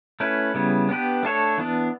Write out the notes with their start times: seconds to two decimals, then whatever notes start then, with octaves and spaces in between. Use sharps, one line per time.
0.20 A3 C#4 E4 B4
0.54 C#3 G3 B3 E4
0.89 B3 D4 G4 B4
1.23 A3 D4 A4 C#5
1.58 E3 B3 D4